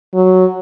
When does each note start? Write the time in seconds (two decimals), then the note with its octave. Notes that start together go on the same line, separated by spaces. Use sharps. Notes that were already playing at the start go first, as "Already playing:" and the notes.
0.15 F#3